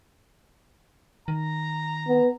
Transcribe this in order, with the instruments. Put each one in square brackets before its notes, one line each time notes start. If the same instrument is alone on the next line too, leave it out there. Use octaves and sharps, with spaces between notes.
[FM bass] D#3 [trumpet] A#5
[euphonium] B3